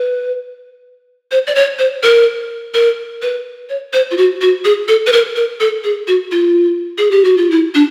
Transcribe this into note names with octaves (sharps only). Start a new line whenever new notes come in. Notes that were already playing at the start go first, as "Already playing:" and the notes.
Already playing: B4
C5
D5
C#5
C5
A#4
A#4
B4
C#5
C5
F4
F#4
F#4
G#4
A4
B4
A#4
A#4
A4
G#4
F#4
F4
G#4
G4
F#4
F4
E4
D4